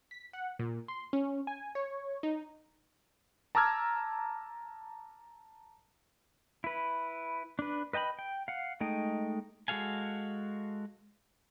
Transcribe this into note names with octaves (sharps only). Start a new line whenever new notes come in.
B6
F#5
A#2
C6
C#4
G#5
C#5
D#4
A5 A#5 D6 E6 F6 G#6
E4 B4
D4 B4
B4 D#5 G5 A5 B5
G5
F5 F#5
G#3 A3 D#4 D#5 G5
G#3 F#4 A4 F5 G#5